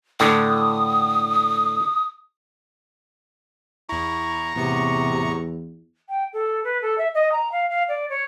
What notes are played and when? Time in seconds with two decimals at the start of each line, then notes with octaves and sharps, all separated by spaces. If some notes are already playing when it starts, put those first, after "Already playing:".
0.20 A2 D3 D#6
3.89 E2 E4 A#5 C#6
4.56 E2 A2 C3 B3 C#7
6.09 G5
6.33 A4
6.64 B4
6.82 A4
6.98 E5
7.14 D#5
7.32 A#5
7.52 F5
7.70 F5
7.88 D5
8.09 C#5